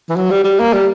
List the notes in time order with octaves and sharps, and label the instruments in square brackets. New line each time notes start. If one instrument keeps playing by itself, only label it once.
[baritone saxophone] E3
F#3
G3
G3
A#3
G3